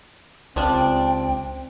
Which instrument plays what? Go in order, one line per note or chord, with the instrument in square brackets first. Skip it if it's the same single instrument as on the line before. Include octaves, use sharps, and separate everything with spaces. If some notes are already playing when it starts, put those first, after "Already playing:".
[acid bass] C#2 [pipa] F3 G3 D4 [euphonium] C4 [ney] G5